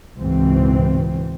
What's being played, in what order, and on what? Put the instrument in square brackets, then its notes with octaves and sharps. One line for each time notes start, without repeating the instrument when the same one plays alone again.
[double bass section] C#2 G#2 B2 E3 C4